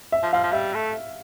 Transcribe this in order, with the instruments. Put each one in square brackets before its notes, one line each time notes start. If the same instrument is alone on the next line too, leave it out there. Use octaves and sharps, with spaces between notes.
[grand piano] E5
[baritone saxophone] F3
[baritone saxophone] F3 [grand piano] F5
[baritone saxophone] F3
[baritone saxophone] G3 [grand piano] E5
[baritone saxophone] A3